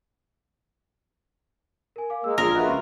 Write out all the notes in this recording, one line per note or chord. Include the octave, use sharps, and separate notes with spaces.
A#4 G#5
F5 D6
G#3 A#3 E6
A#1 F4 G#4 A#4 F5
F4 F#4 B4 D#5 E5
C#2